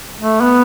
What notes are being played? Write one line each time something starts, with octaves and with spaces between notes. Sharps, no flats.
A3
B3